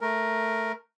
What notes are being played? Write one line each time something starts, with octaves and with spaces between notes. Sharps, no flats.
A3 A#4